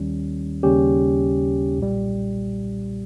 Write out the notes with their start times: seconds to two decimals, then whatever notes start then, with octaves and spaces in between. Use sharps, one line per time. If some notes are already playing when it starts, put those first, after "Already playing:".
Already playing: D#2 D#3 G3 C#4
0.63 D#2 C#3 G3 C#4 G4
1.78 B1 A#2 G3